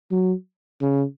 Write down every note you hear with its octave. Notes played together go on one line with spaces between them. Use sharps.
F#3
C#3